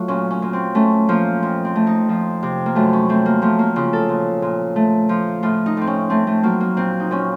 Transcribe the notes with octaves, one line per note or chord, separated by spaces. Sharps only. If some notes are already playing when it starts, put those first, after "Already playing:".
Already playing: F#3 A3 F4
A#2 C#4
C#4
A#2
C4
A3 C#4
F3 A#3
F2
C4
A3
D#4
F3
C3
A#3
F#2 A3
C#4
A3 C4
A#3
F3 A3
A#3
C#3 F4
A4
A#2
A#2
A3
F3
A2 F4
D#4
A2 C4
C#4
A3 C4
A3
F#3 A#3
A#3
A#2 C4
D#4
A#2 C#4